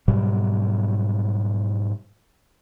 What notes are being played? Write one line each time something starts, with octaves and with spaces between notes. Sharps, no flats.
G#2 B2 F#3 G3